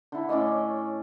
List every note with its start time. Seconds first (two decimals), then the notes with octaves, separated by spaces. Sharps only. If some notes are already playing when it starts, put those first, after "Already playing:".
0.12 D3 E4
0.29 A2 C#4 D5 D#5